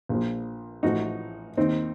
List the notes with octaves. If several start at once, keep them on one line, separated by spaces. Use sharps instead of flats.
A#1 A#2 F3
A1 A2 F3 D#4 F#4
D#2 D#3 C4 D#4